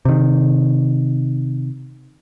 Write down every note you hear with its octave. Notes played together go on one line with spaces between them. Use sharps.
C3 D#3